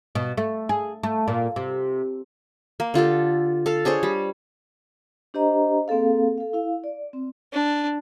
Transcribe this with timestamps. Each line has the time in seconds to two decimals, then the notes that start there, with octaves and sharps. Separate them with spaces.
0.15 B2
0.37 A3
0.69 G#4
1.03 A3
1.28 A#2
1.56 C3
2.80 A#3
2.94 D3 F4 G4 A4
3.66 A4 F5
3.85 D4 G#4 C5 C#5
4.03 G3
5.34 D4 G4 C5 D#5 A#5
5.88 A#3 C4 G#4 A4 F5
6.38 A4 F5
6.53 E4 F5
6.84 D5
7.13 C4
7.52 D4